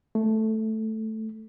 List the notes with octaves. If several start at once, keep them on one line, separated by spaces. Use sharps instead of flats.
A3